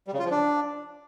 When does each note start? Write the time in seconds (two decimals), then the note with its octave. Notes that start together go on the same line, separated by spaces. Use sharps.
0.07 G3
0.13 C#3
0.19 F4
0.25 F3
0.31 D4